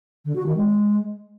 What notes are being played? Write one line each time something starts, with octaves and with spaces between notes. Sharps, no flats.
D3
F#4
D#3
G#3